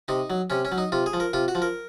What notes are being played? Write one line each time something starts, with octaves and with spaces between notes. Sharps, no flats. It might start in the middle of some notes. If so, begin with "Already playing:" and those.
C3 D#4
F#3
C3 C#4
C#4
F#3
D#4
C3 F4
G#4
F3
A#4
C3 F4
F#4
F3
A#4